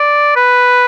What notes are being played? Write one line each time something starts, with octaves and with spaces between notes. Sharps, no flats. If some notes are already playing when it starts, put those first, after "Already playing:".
Already playing: D5
B4